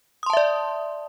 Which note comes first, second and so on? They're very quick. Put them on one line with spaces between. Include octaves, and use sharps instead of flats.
D#6 C6 A5 E5 D5